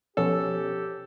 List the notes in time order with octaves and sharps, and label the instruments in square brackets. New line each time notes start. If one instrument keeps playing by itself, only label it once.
[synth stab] B2 F3 B3 [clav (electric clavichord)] C#4 [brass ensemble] G4 [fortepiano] A4